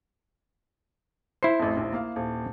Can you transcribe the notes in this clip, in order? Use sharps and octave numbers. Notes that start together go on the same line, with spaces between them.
E4 C5 C7
A1 F2
A#1 D#2
A#3 F5
D#1